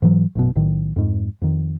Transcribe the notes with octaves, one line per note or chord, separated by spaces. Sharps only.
G#2 E3 F#3
A1 F#2 B2
B1 A2 D#3
F2 G#2
F2 D#3